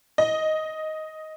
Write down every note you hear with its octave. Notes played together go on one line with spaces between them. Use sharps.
D#5